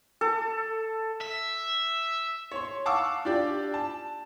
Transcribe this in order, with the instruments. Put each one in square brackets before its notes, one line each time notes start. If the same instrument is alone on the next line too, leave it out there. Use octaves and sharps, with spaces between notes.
[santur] A4
[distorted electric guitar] E5
[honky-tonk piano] C#5 C6
F5 F#5 A5 C#6 D6 E6
D4 F4 G4 D5
A5